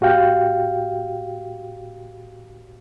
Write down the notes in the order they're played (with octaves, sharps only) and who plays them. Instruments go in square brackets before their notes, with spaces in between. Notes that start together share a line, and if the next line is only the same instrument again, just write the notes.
[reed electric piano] A2 F#4 G4 F5 G5